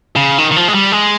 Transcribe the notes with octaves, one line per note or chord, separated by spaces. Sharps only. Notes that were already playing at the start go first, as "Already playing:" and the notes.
C#3
D#3
D#3
F3
G#3
G3
G#3